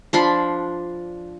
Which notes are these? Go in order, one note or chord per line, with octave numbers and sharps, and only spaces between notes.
F3 D4 B5 C6